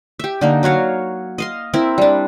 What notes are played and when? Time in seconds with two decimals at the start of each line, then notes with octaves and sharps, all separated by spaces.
0.20 G4 E5
0.41 D3 A#3 D#4
0.63 F#3 F#4 C#5 F5
1.38 D#5 F5 C6
1.73 C4 E4 A#4 E5
1.98 G3 D4